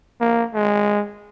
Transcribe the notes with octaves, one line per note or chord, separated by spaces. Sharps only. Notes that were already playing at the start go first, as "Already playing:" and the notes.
A#3
G#3